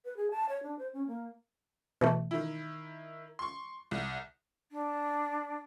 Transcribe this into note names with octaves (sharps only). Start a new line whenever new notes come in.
B4
G#4
A5
C#5
D4
C5
C#4
A#3
B2 E3 A3
D#3 E4
C6 C#6
C2
D4